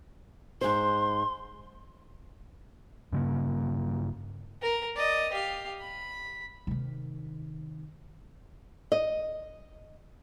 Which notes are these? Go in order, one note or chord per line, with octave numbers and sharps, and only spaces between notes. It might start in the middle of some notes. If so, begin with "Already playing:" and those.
G#2 C5 C6
G2 C#3 A#3
A#4
D5 D#5
G4 F5
B5
C3 D#3
D#5